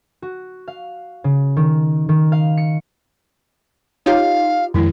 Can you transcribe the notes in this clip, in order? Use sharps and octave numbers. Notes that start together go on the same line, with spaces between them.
F#4
F5
C#3
D#3
D#3
F5
C#7
D#4 F4 G4 C#5 F5
F2 D#3 G#3 E4